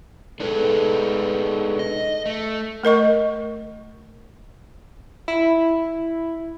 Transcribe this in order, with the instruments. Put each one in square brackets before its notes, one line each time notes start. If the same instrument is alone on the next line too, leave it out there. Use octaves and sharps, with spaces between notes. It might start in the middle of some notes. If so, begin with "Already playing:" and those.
[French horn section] G#3 B3 A4 [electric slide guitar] D4 D#4 B4
[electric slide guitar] D#5
A3
[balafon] A3 A#4 D#5 C#6
[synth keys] E4